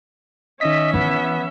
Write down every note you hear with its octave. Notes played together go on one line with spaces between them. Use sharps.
D#3 C#4 D#5 E5 B6
E3 B3